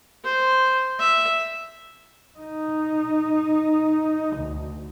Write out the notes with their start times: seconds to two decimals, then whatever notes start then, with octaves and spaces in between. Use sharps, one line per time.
0.24 C5
0.99 E5
2.39 D#4
4.36 D2